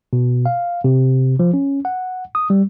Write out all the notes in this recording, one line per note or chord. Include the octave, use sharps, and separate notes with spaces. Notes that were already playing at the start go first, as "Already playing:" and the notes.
B2
F5
C3
F3
C#4
F#5
D#6
G3